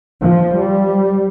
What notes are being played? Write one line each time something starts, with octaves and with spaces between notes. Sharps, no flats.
F3
G3